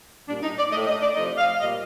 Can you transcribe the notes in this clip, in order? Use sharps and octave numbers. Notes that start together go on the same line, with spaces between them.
A#2 G3 D4
D#4
D5
A2 A3 D#5
D#5
D5
C3 F3 A3 D#5
F5
A#2 G3 D#5